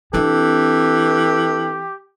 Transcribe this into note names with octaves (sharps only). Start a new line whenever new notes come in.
E3 C4 D4 G4 A4